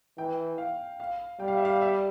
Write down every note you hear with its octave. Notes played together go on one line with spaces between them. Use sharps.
E3 G5
F5
F5
G3 G5
F5
E5
F5
E5